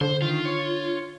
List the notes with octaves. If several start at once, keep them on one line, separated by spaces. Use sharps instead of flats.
D3 C5
D#3 F4
C#5